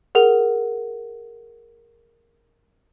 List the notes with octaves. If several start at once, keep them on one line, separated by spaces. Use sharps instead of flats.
G#4 A#4 F#5 F7